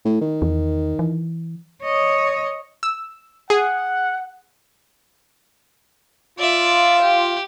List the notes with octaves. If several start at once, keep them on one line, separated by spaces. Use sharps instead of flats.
A2
D#3
E2
E3
C#5 D#5
E6
G#4 F#5
F4 D5 E5
G4